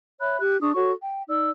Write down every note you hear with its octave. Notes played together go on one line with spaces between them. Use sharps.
C#5 E5 B5 F#6
G4 F#6
D4 G#4 C#6 D#6
F#4 A4 C#5 C#6
G5
D#4 D5 E6